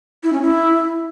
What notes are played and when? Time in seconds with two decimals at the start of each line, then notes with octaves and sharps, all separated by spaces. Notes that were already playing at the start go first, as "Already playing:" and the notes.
0.24 E4
0.33 C#4
0.42 E4